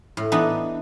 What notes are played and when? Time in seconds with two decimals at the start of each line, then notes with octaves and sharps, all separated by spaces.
0.17 A2
0.32 E3 B3 D4 D#4